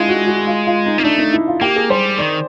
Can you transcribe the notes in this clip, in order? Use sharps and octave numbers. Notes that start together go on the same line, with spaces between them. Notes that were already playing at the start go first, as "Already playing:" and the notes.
Already playing: G#3 D4 E4 F4
F#4
F#4
F4
F4
D#4
A#3 D#4
A3 D4
D#4
E4
F4
A#3 G4
G#4
G3 C5
D#3 D5